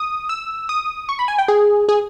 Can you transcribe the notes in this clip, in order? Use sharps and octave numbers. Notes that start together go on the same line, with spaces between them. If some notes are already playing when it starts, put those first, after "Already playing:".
Already playing: D#6
E6
D#6
C#6
B5
G#5
G5
G#4
G#4